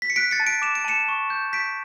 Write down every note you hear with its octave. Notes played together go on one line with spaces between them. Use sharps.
B6
C#7
F#6 B6 D7
A6 C#7
A5
B6 D7
D6 E7
D7
A5 C#7 E7
C#6
G6
G6 B6 D7